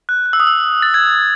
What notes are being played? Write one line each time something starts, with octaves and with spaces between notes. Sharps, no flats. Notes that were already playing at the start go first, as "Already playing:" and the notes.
F#6
F#6
E6
D#6
E6
A6
G#6